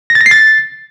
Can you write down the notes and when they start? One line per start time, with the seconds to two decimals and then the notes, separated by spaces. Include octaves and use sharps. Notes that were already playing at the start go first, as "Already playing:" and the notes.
0.10 A#6
0.15 A6
0.21 A#6
0.26 C7
0.31 A6